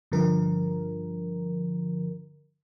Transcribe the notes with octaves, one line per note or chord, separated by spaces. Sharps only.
G2 D3 F3 A#4